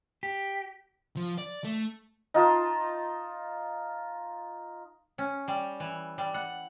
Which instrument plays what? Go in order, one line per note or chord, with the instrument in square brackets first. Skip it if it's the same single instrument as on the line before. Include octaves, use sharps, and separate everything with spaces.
[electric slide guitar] G4
[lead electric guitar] F3
D5
A3
[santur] D#4 F4 A5 C6
[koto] C#4
G3
E3
G3
F#5